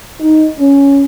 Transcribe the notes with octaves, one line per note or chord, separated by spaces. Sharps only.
D#4
C#4